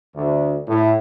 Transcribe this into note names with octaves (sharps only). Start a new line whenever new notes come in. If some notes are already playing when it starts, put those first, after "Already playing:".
D2
A2